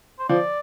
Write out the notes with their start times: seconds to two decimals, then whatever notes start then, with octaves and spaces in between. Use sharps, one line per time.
0.19 C5
0.29 F3 D5